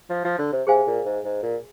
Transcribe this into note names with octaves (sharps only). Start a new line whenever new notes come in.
F3
F3
D3
C3
C3 G#4 C5 F5 G#5
A#2
G#2
G#2
A#2